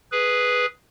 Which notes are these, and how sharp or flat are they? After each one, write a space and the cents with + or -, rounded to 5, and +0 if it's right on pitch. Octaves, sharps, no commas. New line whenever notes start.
G#4 +0 B4 +0